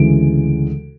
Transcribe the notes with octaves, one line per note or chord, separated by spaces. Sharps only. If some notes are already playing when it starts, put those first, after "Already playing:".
Already playing: D2 C#3 E3 G#3 D7